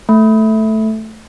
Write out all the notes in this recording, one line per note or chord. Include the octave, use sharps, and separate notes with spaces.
A3